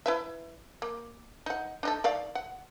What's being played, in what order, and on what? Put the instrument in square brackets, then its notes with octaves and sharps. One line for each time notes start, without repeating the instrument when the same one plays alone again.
[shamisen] E4 B4 E5
A#3
D#4 F#5
D4 D#4 A4
D#3 D5 F5
F#5